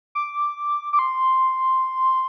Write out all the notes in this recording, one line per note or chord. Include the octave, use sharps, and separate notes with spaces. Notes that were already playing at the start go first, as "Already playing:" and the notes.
D6
D6
C6